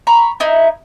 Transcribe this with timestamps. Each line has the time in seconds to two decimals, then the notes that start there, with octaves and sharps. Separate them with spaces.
0.07 A#5 B5 C#6
0.40 D#4 E4